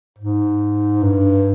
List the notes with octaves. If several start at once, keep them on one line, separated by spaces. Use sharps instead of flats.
G#2
G2